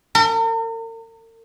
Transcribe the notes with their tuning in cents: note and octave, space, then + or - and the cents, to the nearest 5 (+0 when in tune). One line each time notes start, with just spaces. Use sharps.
A#4 -45